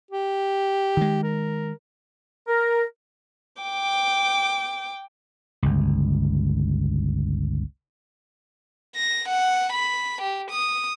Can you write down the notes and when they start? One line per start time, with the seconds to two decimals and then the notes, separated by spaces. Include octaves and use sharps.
0.11 G4
0.97 D#3 G#3
1.23 A#4
2.48 A#4
3.62 G5 D6
5.63 G1 C#2
8.96 A#6
9.28 F#5
9.73 B5
10.21 G4
10.51 D#6